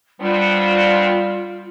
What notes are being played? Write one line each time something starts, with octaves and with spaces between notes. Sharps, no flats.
G3 B3 C4 D4 F4